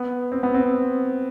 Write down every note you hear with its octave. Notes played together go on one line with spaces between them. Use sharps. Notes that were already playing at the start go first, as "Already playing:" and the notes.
Already playing: B3
C4
B3
C4